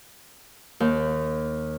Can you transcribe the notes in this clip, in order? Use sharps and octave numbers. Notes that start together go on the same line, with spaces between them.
D#2